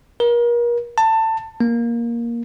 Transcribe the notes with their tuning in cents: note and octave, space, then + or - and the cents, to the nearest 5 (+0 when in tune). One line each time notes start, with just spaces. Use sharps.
A#4 +35
A5 +20
A#3 +10